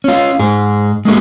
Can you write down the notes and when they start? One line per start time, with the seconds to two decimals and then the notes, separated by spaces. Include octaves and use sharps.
0.04 C#4 F4
0.39 G#2 G#4
1.05 G#3 A#3 C#4 F#4 G#4